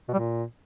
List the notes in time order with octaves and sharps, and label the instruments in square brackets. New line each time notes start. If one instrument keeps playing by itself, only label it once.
[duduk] B2
G3
A#2